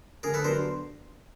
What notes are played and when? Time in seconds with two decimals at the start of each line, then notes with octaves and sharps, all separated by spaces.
0.23 D3 G#4 A#4
0.34 A4 B4
0.44 F#3 B3 D4 A#4 C5